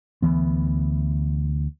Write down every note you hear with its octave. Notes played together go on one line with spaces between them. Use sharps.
D2 E3 B3